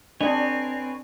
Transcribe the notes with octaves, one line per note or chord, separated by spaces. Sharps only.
C4 D4 B4 C#5 D#5 G#5